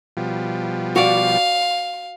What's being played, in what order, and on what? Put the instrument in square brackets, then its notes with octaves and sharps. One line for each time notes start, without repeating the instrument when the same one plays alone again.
[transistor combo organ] B2 F3 G3
[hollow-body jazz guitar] F#4 D5 [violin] F5